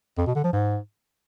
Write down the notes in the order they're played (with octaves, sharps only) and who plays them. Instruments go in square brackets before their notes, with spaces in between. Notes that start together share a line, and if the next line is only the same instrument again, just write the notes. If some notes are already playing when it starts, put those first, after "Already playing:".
[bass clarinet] F2
B2
D3
F3
G#2